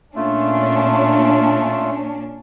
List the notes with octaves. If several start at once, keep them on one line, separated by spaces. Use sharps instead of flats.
A#2 A3 C#4 D4 F4